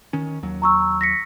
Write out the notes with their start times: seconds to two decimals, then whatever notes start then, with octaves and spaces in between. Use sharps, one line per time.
0.13 D#3 C#4
0.43 D#2 F#3
0.62 A#5 C#6 E6
1.01 A#6 B6 C#7